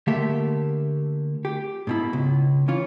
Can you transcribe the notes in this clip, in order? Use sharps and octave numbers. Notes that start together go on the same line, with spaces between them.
D3 A3 A#3 G4 E5
G4
G#2 B2 E4
C#2
E3 C#4 F4